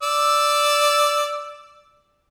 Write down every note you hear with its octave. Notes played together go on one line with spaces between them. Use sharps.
D5 E6